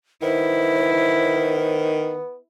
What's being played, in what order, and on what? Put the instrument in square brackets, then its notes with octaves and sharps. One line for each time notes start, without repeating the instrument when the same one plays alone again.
[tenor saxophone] D#3 [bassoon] B3 [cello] E4 [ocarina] C5